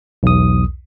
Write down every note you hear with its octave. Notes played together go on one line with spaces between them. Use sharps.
B1 E2 D#6